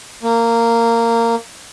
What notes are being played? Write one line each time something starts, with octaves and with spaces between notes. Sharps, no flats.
A#3